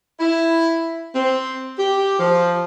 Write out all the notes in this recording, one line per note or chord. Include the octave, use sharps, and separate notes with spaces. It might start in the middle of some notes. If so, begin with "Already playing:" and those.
E4
C4
G4
F3